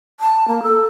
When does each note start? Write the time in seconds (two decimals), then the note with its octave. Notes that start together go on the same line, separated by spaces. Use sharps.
0.20 A5
0.48 A#3
0.63 A4